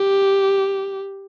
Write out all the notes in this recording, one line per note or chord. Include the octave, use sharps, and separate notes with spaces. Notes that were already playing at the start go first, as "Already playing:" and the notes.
Already playing: G4